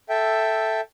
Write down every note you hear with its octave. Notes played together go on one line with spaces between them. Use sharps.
A4 E5 G5